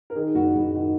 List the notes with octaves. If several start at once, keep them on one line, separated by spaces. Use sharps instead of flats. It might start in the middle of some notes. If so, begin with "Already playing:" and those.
A#4
D#3 G#4
F#1 F#4
F#1 G#4
D#3 F#4